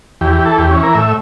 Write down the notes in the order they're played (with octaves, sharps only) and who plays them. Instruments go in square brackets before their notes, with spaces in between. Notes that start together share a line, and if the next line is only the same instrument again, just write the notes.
[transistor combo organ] E2 G4
G4
E3
A4
E2 G4
C#4
E3
A#4
A2 E5